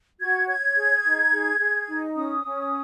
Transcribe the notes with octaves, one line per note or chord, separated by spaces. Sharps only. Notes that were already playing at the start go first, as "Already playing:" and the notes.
F#4 G#6
C#5 G#6
G#4
D#4
G#4
G#4
D#4
C#4 D#6
C#4